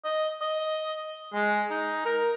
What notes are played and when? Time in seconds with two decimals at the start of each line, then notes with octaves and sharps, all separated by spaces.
0.04 D#5
0.41 D#5
1.33 G#3
1.70 D#4
2.05 A#4